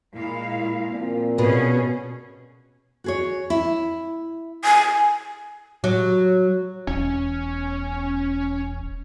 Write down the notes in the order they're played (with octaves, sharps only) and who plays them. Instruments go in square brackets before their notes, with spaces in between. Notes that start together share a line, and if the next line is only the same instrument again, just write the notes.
[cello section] A#2 G#3 F5 [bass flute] E4
[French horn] A#2 [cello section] F3 [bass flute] C4
[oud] B2 [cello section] B3 C#4 G#4
[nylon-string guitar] F#4 G#4 C#5
E4
[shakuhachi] G#5
[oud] F#3
[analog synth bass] E1 [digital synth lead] C#4